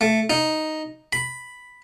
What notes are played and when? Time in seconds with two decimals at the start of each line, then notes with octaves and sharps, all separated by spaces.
0.01 A3
0.30 D#4
1.13 B5